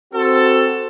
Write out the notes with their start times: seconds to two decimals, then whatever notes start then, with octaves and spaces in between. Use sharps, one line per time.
0.13 C4 F#4 A4